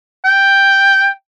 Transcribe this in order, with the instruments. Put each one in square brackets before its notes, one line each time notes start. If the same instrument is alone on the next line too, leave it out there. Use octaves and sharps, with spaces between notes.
[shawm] G5